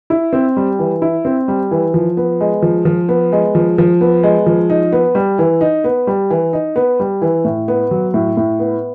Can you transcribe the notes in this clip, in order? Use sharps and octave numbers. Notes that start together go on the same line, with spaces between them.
E4
C4
G3
E3
E4
C4
G3
E3
F3
B3
G#3
F3
F3
B3
G#3
F3
F3
B3
G#3
F3
D#4
B3
G3
E3
D#4
B3
G3
E3
D#4
B3
G3
E3
A2
B3
F#3
A2
A2
B3